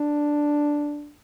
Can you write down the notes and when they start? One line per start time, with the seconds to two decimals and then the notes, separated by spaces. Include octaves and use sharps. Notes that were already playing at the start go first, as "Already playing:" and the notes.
Already playing: D4